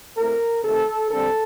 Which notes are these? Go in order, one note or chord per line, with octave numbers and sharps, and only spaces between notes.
A2 A3 C4 A#4
C3 D#3 A3 C4 A4
D3 G3 C4 A4